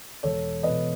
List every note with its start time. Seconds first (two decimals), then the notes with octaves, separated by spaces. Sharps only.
0.23 E1 A4 C#5
0.63 E2 B2 B4 D#5